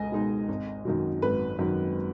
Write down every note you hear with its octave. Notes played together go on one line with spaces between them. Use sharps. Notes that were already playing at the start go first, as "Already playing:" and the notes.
Already playing: C#2 B2 G#3 D#5 G#5
B2 G#3 D#4
G#1
F#2 D#3 F#3
G#1 B4
F#2 D#3 F#3